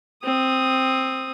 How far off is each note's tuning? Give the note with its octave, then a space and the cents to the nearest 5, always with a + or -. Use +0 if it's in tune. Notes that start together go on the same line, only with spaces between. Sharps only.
C4 +5 D#6 +0